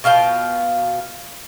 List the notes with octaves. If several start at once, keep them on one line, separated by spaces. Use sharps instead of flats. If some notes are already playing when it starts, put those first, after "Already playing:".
B2 F4 F5 G5